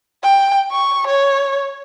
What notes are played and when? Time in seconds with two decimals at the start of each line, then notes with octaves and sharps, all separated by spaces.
0.23 G5
0.71 C#6
1.07 C#5